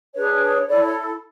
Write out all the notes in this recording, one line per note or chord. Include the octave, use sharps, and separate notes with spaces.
D4 G#4 B4 C#5
E4 A4 C#5 D5
C#5